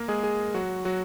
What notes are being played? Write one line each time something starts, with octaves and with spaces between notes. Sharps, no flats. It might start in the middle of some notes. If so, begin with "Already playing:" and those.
Already playing: A#3 A#4
G#3 G#4
G#3 G#4
F#3 F#4
F#3 F#4